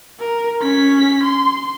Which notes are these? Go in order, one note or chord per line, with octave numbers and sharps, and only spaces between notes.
A#4
C#4 B6
C6